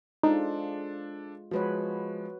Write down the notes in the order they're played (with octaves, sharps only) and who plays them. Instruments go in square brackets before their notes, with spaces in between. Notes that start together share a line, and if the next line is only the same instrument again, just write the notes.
[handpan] G#3 F4 [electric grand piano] D4 A4 C5 [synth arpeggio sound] D#4
[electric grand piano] F3 G#3 [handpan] F#4 B4 C#5